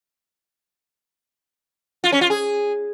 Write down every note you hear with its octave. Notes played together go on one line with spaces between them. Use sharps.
F4
C#4
F4
G#4